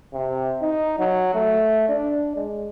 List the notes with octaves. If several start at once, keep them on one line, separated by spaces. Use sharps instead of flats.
C3
D#4
F#3
A3
D4
G#3